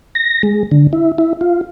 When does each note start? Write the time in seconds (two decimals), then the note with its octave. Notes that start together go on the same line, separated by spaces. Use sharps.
0.15 A#6
0.43 G#3
0.71 D3
0.93 E4
1.18 E4
1.41 F4